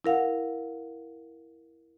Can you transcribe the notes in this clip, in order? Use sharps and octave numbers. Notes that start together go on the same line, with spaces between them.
E4 A#4 F5 F#5